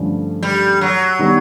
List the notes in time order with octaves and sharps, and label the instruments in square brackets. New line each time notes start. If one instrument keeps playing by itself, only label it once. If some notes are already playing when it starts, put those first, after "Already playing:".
Already playing: [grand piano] G2 D3 F3 A3 C#4
[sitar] G3
F#3
[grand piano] D#3 G3 B3